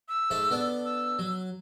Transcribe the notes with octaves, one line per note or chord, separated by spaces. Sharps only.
E6
G#2 A3 E5
B3 D4 A4
E6
F#3